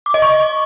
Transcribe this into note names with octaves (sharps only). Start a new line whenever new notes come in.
D6
D#5
C#6